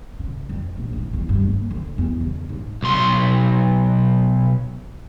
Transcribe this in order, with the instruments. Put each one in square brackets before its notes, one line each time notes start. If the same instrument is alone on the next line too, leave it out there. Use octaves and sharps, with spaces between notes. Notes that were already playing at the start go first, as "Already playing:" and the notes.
[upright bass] C#3
F2
A#1
A1
E2
G2
A#3
D3
E2
C#3
G#2
[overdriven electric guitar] B1 C6